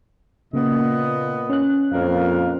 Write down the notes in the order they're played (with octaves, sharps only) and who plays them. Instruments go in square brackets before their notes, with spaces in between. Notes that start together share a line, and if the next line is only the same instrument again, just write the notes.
[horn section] A#2 B3 D#5 [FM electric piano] C#3 A#3
[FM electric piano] C#4 F#6
[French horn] F2 [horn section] A#2 A#4 F5